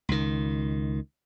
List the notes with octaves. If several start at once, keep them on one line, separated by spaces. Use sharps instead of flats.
C#2 D#3